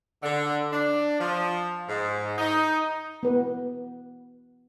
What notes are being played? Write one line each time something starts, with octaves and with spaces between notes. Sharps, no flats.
D3
D4
F3
G#2
D#4
B3 B4